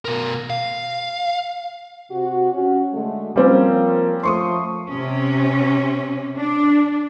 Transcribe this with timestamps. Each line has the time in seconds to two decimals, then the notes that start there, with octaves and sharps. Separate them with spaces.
0.05 B2 A#4
0.50 F5
2.11 C3 F#4
2.53 C#4 F#4
2.93 D3 G#3 A3
3.36 F3 G3 A#3 C4 C#4
4.23 F3 A3 C6 C#6 D#6
4.89 C3 C#4
6.37 D4